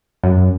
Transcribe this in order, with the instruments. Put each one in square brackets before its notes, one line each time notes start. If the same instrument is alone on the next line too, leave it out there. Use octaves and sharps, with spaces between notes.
[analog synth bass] F#2